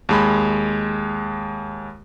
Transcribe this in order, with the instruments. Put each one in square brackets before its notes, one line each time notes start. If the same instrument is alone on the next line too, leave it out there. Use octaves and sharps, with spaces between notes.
[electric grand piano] D#2 G#3 B5